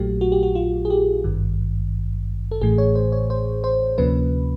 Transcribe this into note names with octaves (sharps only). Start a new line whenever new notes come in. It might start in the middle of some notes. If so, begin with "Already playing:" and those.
Already playing: A#1 A#2 F#3 A3 G4
F#4
G4
F#4
F4
G#4
G4
G#1 G2 D#3
A4
A1 A2 E3 A3 G#4
C#5
C5
C#5
C5
C5
D2 C3 F3 A#3 C#4 B4